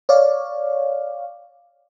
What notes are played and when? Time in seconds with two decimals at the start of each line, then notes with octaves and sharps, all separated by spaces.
0.09 C#5 D5 F5